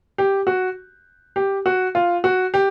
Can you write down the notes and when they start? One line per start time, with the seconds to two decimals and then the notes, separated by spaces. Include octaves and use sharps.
0.18 G4
0.47 F#4
1.36 G4
1.66 F#4
1.95 F4
2.24 F#4
2.54 G4